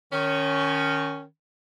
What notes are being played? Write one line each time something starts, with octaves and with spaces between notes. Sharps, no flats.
D#3 C#4